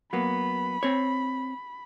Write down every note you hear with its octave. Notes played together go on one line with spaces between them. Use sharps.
F#3 A#3 B3 B5
C4 C#5